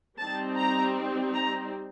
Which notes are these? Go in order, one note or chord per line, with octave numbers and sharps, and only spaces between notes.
G3 C4 D#4 A5
A#5
A#5